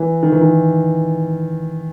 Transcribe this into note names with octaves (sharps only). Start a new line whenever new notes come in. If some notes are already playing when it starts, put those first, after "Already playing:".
Already playing: E3
D#3
E3
D#3